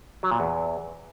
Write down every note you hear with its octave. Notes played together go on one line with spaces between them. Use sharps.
F#3
A#2
E2